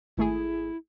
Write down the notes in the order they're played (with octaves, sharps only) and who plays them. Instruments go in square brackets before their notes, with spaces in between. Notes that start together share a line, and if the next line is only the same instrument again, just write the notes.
[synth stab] G#1 A3 G#4 [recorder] E4